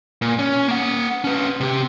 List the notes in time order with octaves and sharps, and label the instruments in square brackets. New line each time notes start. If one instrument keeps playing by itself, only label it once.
[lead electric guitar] A#2
C#4
A#3 F#5
C#4 B4
C3 G4